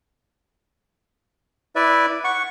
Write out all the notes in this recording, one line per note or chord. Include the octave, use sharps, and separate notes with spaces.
E4 B4 D5 E5
F#5 C#6